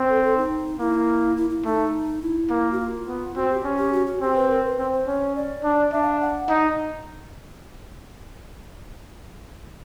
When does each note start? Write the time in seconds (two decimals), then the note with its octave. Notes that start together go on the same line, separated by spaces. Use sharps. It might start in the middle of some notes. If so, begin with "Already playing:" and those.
Already playing: C4
0.09 A4
0.22 A4
0.37 D#4
0.79 A#3 E4
1.37 E4
1.50 E4
1.65 A3 D#4
2.22 E4
2.50 A#3
2.71 F#4
2.79 F4
3.07 B3
3.35 C4 F#4
3.50 G4
3.64 C#4
3.78 G4
3.93 F#4
4.06 F#4
4.21 C4 G4
4.35 B4
4.49 A#4
4.64 B4
4.78 C4 C5
4.93 C5
5.07 C#4 C#5
5.35 D5
5.64 D4
5.92 D4 E5
6.02 F5
6.21 F#5
6.49 D#4